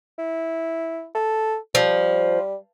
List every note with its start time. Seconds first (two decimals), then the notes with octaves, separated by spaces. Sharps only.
0.19 E4
1.15 A4
1.75 F3 G3